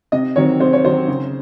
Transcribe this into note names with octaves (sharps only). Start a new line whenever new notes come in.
C3 D#5
D#3 F#3 C4 C#5
C3 C5
C#5
D#3 F#3 C4 C5
C#3